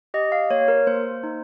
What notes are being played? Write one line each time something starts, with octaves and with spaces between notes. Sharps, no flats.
G4 D#5
F5
A#3 C#5
A#4
A#3 C5
D#4